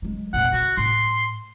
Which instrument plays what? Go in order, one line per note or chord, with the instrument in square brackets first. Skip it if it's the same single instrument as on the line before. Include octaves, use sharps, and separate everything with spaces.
[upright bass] F#3 G#3
[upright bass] F2 A#2 [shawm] F#5
[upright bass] E4 [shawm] F#4
[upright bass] A2 [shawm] C6